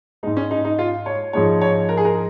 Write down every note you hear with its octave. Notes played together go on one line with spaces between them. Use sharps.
G#2 G#3 D#4
C#4
D#4
D#4
F4
C#5
G#2 F3 G#3 C#5
C#5
A#4
G#4
A#4